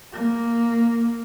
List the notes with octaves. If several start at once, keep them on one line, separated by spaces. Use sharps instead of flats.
A#3